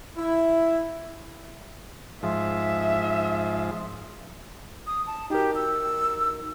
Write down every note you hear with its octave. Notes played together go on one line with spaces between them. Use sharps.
E4
G#2 F3 E5
D#6
A5
D#4 F#4 G4 A#4
E6